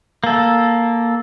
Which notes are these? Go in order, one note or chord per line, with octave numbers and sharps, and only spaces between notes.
A#3 A4